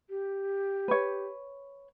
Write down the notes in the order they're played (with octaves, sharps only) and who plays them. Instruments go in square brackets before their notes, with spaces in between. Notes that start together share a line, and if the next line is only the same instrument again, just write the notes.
[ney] G4
[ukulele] B4 C#5